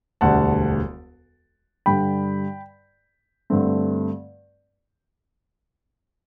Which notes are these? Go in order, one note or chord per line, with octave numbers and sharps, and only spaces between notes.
E1 D2 D3 G3 F#5 A5
G2 D3 G3 G5 B5
G2 D3 A3 C4